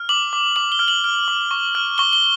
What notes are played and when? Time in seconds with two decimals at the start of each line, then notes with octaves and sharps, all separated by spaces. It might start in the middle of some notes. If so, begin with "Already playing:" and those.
Already playing: F6
0.09 D6 F#7
0.33 D6
0.56 D6 F#7
0.72 G7
0.79 F6
0.88 F#7
1.04 F6
1.28 D6
1.51 C#6
1.75 F6
1.98 C#6 G7
2.13 G7